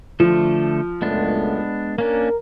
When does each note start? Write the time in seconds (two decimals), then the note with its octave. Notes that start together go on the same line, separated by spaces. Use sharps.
0.20 D3 F3 A3 A4
1.02 C#2 F#2 G#3 A3 B3 D4
1.98 A#3 C#4 D4 A#4